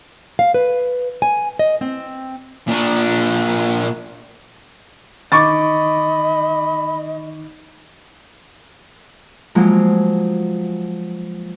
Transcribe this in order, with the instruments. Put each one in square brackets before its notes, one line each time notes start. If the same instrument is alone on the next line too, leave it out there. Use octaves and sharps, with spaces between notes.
[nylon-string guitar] F5
B4
G#5
D#5
C4
[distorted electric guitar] A#2 D4
[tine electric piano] D#3 D#4 [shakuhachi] D#5 [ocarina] B5 [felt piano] C#6 D6 A6
[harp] F3 F#3 G#3 A#3